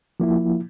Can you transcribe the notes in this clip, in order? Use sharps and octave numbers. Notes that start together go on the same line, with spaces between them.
F3 A#3 E4